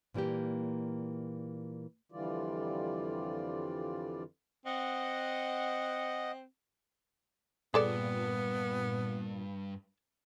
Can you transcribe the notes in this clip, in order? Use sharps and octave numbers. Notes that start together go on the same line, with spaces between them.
A#2 E3 G3 A#3 G4
F2 D3 E3 G3 F4 D5
C4 D#5 F#5
G2 A#2 B3 G#4 A4 D5